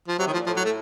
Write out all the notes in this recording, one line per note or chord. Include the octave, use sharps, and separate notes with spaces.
F3
C3 F#3
A2 D#3
F3
A#2
A2 F3
F#3
A3